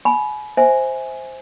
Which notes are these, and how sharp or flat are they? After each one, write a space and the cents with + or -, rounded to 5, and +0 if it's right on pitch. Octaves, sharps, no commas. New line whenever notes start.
G#5 +35 B5 -10
C5 +0 E5 -25 G#5 +0